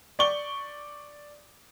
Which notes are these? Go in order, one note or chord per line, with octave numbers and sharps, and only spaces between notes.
D5 C#6 G7